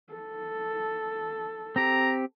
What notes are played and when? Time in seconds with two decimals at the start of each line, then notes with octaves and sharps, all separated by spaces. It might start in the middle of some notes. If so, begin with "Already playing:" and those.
0.13 A4
1.76 C4 G4 A#5